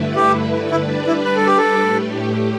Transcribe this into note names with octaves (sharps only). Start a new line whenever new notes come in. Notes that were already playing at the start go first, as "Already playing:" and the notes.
Already playing: G2 D3 A3 E4 B4
G4
G3 D4 E4 B4 D5
E4
B4
A4
G4
A4
A2 A3 G4